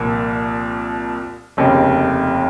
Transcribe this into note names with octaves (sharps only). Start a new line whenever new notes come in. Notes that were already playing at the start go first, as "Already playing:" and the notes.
Already playing: C2 A#2 F3 A#3
F1 D#2 C#3